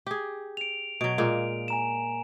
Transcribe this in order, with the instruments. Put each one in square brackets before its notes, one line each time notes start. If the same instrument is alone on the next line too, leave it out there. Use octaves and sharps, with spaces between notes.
[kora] G4 G#4
[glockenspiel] D7 F7
[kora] B2 F#3 [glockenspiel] D7
[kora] A#2 G#3 A#3
[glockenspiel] G#5 A#5 E7